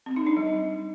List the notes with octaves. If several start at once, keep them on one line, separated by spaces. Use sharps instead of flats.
C4
D#4
D4
G3